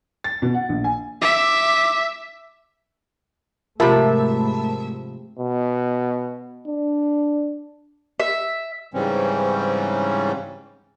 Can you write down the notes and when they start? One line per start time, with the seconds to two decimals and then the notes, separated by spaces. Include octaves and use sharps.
0.24 A6
0.42 B2
0.54 F#5
0.69 A#1
0.84 G#5
1.22 E5 D6
3.80 G#2 C3 F3 A3 A#4 E5 A5 B5
5.39 B2
6.67 D4
8.20 E5
8.94 G#2 C#3 E3 G3 C4 C#4